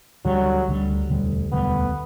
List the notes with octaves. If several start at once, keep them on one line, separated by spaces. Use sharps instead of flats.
D2 D3 F#3 G3
D2 D3 G3
E1 D2 D3 G3
E1 D2 D3 G3 B3